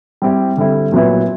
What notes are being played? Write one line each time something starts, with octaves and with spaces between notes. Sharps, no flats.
G3 C4 E4 G4
D3 G3 C4 E4
A#2 F#3 B3 E4